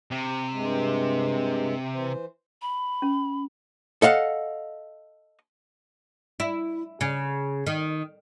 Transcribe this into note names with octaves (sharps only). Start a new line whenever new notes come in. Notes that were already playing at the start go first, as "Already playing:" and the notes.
C3
G2 G#3
E3 C5
B5
C#4
A4 D#5 F5 F#5
E4
C#3
D#3